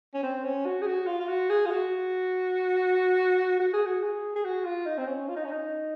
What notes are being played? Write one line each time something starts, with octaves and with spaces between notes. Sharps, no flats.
C#4
C4
C#4
F#4
G#4
F#4
F4
F4
F#4
G#4
F4
F#4
F#4
G#4
F#4
G#4
G#4
F#4
F4
D#4
C4
C#4
F4
D#4
C#4
D#4